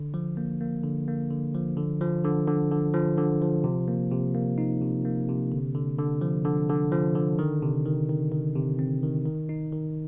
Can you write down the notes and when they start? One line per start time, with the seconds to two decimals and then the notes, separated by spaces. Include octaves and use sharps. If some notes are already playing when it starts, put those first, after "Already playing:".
Already playing: D3
0.14 F3
0.37 A#3
0.61 A#3
0.83 D3
1.08 A#3
1.31 D3
1.55 F3
1.77 D3
2.01 F3
2.24 D3
2.47 D3
2.71 D3
2.94 F3
3.18 D3
3.42 F3
3.64 C3
3.88 A#3
4.11 C3
4.35 A#3
4.58 D#4
4.82 C3
5.05 A#3
5.29 C3
5.52 D3
5.75 D3
5.98 D3
6.21 F3
6.45 D3
6.69 D3
6.92 F3
7.15 D3
7.39 D#3
7.62 C3
7.85 D#3
8.09 D#3
8.32 D#3
8.56 C3
8.79 C4
9.03 D#3
9.26 D#3
9.49 D#4
9.73 D#3